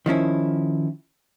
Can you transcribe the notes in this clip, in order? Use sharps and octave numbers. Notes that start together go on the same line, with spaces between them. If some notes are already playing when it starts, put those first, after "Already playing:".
D#3 F3 C#4 E4